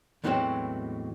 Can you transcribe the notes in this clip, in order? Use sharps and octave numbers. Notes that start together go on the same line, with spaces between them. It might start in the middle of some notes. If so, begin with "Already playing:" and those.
E2 A2 E3 F#3 G#3 C4